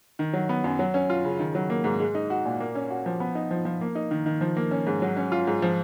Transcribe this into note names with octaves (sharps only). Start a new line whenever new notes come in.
D#3
F#3
B3
F#2
F#3
C#4
F4
C#3
D#3
F#3
A#3
G#2
G#3
D#4
F#4
A#2
A#3
C#4
F#4
F3
B3
D#4
F3
F3
A#3
D#4
D#3
D#3
F3
A#3
C#4
G#2
F#3
C#4
F4
G#2
F3